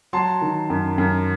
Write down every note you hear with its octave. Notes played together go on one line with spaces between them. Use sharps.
F#3 A5 C6
D#3
F#2
F#2